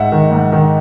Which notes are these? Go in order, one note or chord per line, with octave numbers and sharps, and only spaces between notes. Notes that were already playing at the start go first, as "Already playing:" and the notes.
Already playing: G#2 E5 F#5
D#3
G#2
D#3